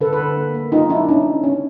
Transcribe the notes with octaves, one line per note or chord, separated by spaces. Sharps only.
D3 A4 B4
A4 B4
D3
A#3
A#3
F#3 D#4 F4
F#3 D4 E4
C#4 D#4
C#4
B3 C#4